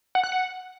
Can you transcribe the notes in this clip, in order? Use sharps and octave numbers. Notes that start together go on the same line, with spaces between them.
F#5
F#6
F#5